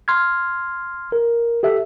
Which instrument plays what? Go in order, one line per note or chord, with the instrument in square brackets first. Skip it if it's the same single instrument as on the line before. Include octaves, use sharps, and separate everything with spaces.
[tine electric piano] C6 F6 G#6
A#4
G4 A4 E5